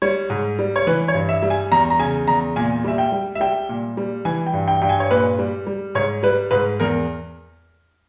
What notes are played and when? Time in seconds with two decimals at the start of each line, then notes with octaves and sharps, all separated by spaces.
0.02 G3 C#5
0.30 G#2
0.59 G3
0.76 C#5
0.87 E3 B4
1.08 C#5
1.14 G2
1.29 E5
1.43 G3
1.50 G#5
1.71 E2 A#5
1.90 A#5
1.99 C#3 G#5
2.27 E2 A#5
2.56 A#2 G#5
2.84 G3 E5
2.98 G5
3.12 G3
3.35 E5
3.40 G3 G5
3.69 A#2
3.97 G3
4.25 E3 G#5
4.47 G5
4.53 G2
4.68 G5
4.82 G2 G5
4.89 G#5
5.00 C#5
5.10 A#2 B4
5.39 G3
5.67 G3
5.95 G#2 C#5
6.23 G3 B4
6.51 G#2 B4
6.80 E2 A#4